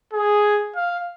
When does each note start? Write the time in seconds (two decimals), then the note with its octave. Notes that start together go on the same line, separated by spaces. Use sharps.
0.13 G#4
0.76 F5